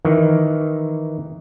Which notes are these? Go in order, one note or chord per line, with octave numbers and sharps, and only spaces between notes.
D#3 E3